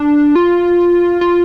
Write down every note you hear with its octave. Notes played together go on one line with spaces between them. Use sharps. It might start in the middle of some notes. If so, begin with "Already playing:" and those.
Already playing: D4
F4
F4